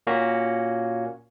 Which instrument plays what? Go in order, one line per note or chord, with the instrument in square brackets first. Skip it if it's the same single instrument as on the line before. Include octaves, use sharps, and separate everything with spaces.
[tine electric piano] A#2 A#3 C#4 F#4